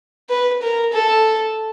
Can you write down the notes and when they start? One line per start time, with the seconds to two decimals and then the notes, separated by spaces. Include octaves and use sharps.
0.29 B4
0.62 A#4
0.93 A4